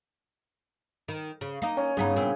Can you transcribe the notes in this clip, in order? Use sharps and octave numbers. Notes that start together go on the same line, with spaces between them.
D#3
C#3
A#3 D#4
C#4
G2 C#3 B3 D#4
A#2 B3 C4